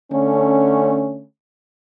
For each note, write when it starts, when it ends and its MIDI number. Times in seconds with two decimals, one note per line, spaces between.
0.12 1.24 50
0.12 1.24 57
0.12 1.24 61